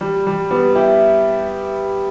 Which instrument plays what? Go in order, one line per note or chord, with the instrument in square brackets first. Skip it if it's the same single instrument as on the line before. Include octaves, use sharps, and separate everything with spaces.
[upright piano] G3
G3
G3 B3
E4 G4